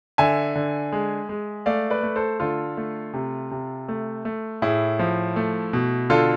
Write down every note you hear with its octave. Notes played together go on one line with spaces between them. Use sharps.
D3 E5 G#5
D3
G#3
G#3
A3 D5 F5
B4 D5
A3
A4 C5
D3 F4 A4
A3
C3
C3
A3
A3
A2 E4 G#4
F3
A3
B2
D3 F4 A4